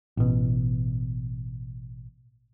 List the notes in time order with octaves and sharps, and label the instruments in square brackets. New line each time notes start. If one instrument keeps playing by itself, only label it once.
[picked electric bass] A1 B2